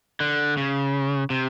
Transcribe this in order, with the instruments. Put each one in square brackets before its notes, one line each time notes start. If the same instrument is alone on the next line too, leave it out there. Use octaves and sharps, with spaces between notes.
[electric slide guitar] D3
C#3
C3